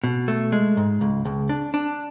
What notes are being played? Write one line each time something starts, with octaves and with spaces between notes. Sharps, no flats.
B2
A3
G#3
G#2
C#2
C#2
D4
D4